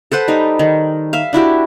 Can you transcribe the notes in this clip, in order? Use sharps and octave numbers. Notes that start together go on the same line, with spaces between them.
A4 B4 C5 F#5
G3 D#4
D#3
E5 F5
D4 E4 F#4 G4